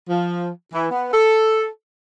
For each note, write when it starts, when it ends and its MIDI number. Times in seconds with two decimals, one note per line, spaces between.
0.09 0.47 53
0.73 0.86 52
0.91 1.09 59
1.12 1.66 69